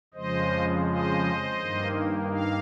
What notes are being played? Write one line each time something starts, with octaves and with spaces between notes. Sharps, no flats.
F2 C#3 F3 G#3 C5 D#5
C5 D#5
G2 D#3 A#3
F5